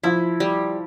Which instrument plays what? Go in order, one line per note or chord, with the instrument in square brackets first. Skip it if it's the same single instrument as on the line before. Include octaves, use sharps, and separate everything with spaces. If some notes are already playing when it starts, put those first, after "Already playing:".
[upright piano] F3 [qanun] E4
[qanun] G3